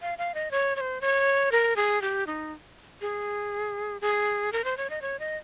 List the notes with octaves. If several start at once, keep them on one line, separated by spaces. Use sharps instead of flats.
F5
F5
D#5
C#5
C#5
C5
C#5
A#4
G#4
G4
D#4
G#4
G#4
A#4
C5
C#5
D#5
C#5
D#5